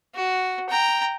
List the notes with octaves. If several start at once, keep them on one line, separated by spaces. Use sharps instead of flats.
F#4
G5 A#5